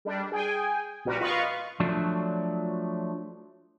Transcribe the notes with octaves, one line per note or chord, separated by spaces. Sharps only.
G3 D4
G#4 G5 G#5
A#1 G3 F#4 A#4 B4
F4 B4 D#5 F5 C#6
F3 F#3 A3 D4